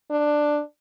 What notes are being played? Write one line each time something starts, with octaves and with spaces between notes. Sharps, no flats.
D4